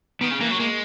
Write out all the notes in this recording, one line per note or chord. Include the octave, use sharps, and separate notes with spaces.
D#3 B3
C#3
E3 A#3
F#3
G#3 A#3